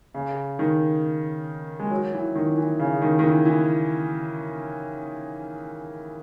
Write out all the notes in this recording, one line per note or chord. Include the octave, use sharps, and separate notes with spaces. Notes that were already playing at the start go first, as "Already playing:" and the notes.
C#3
D#3
G#3
F#3
E3
D#3
E3
C#3
D#3
D#3
E3
E3